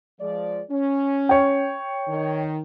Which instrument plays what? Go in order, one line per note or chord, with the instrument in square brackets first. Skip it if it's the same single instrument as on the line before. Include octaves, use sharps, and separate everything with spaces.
[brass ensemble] F3 G#3 D5
C#4
[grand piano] C#5 G5
[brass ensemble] D#3